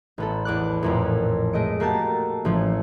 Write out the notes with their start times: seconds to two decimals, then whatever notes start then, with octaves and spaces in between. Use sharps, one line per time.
0.18 A1 B3 A4
0.45 E2 D6 F#6
0.83 A1 F2 A#2
1.53 G#3 A3 D#5 D7
1.80 A3 A#3 F#4 G4 A5
2.45 A1 F3 C#4